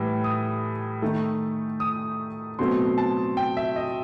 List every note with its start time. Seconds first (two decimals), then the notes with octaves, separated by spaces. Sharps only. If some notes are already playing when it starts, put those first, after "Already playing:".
Already playing: A2 E3 G3
0.24 D#6
1.02 D#3 A3 D#4
1.80 D#6
2.59 B2 F#3 A3 C4 C6
2.98 A5
3.37 G5
3.57 E5
3.76 D#5